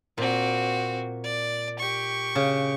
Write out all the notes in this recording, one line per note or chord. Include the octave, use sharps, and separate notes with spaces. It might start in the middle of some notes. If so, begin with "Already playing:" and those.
A#2 C4 F#4
D5
G4 C#6
C#3